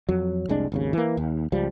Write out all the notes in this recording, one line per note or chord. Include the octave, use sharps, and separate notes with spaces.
F2 F#3
F1 C2 G#3 D4
G#1 D#2 C#3
E3 A#3
D#2
C#2 F3 G3